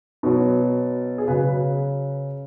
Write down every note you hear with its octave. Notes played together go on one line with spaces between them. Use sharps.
B2 F#3
G#4
C#3 F#3 B4